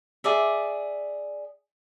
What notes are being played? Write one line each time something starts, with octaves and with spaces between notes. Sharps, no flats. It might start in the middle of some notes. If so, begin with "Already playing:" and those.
G#4 D5 E5